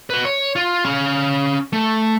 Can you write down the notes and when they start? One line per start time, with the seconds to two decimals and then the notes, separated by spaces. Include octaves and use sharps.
0.10 F#4 B4
0.25 C#5
0.56 F4
0.85 C#4 F5
1.73 A3